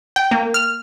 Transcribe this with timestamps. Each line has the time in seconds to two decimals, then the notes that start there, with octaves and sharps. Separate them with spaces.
0.16 G5
0.31 A#3
0.54 F6